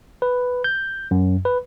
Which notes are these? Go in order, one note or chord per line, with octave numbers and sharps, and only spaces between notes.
B4
G6
F#2
B4